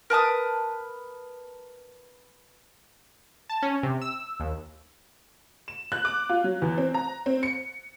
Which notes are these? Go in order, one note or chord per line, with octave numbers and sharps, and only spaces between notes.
A#4 B4 A5 D#6
A5
C#4
C3
E6
D#2
E7
F#6
D6
F4
F#3
E2
C4
A#5
C4
C#7